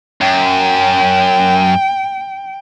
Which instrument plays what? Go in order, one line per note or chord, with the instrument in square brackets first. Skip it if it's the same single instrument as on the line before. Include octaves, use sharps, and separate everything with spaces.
[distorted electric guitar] F#2 [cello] G5